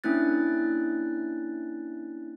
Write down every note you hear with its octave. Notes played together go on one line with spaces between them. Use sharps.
A#3 C#4 D4 E4 F#6 A6